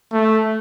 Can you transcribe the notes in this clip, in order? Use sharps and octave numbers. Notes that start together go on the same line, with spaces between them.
A3